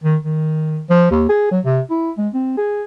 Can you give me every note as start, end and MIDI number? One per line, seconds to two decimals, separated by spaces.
0.04 0.16 51
0.25 0.80 51
0.90 1.07 53
1.11 1.27 39
1.29 1.51 68
1.51 1.60 54
1.65 1.81 48
1.90 2.11 64
2.18 2.29 56
2.34 2.54 60
2.57 2.84 68